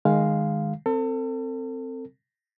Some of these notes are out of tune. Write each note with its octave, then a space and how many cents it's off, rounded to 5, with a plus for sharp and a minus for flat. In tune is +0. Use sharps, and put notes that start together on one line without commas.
D#3 -15 G#3 +0 F5 +0
C4 +0 A4 +35